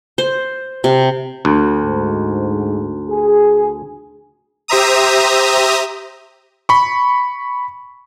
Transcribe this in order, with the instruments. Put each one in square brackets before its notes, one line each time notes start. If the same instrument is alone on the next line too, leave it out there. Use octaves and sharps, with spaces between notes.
[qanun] C5
C3
[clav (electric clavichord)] D2
[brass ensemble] G#2
G#4
[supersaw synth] G4 C5 E5 A#5 D#6
[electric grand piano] B5 C#6